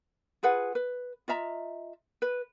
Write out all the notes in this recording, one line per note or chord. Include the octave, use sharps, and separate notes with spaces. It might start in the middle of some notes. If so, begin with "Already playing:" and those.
F4 G#4 B4 F#5
B4
F4 D#5 E5 A#5
B4